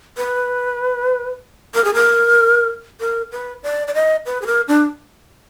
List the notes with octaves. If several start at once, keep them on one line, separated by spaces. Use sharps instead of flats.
B4
A#4
G#4
A#4
A#4
B4
D5
D5
D#5
B4
G#4
A#4
D4